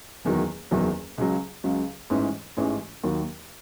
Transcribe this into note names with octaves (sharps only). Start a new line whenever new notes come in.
F#1 E2 D#3 F#3
F#1 E2 D#3 F#3
C#2 C#3 F#3
C#2 C#3 F#3
A1 G#2 E3 G#3 C#4
A1 G#2 E3 G#3 C#4
D#2 D#3 F#3